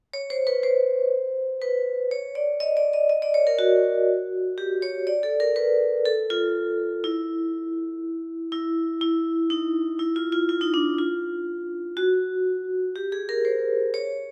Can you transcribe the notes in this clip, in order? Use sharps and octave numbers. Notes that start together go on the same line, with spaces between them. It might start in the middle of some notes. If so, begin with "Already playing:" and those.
C#5
C5
B4
C5
B4
C#5
D5
D#5
D5
D#5
D#5
D5
C#5
A#4
F#4
G4
C#5
D5
A4
A#4
B4
A4
F4
E4
E4
E4
D#4
E4
F4
F4
F4
D#4
D4
F4
F#4
G4
G#4
A#4
C5
C#5